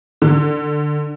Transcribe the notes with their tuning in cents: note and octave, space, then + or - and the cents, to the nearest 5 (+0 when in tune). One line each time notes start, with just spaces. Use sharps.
D3 +15